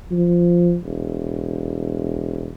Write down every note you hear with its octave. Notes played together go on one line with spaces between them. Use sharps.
F3
E1